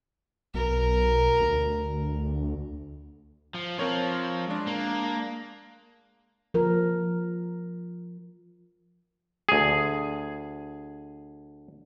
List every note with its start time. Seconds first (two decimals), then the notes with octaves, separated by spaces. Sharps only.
0.54 B1 A#4
1.39 D2
3.54 F3
3.79 F3 C4 A#4 C#5
4.47 G#3 D4
4.67 A#3
6.54 F3 A#4
9.49 D2 G#4